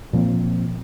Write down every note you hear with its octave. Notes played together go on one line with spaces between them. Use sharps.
A#2 F3 A#3 C4